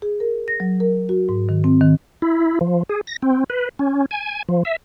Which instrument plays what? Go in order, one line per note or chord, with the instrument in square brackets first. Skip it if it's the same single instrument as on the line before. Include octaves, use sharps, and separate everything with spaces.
[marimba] G#4
A#4
A#6
F#3
A#4
F#4
G#2
D#3
C4
D#3
[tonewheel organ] E4
F3
G#4
A#6
C4
B4
C#4
G#5
F3
E5